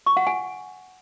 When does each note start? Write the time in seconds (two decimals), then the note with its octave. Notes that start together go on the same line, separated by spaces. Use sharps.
0.06 C#6
0.17 F#5
0.27 G#5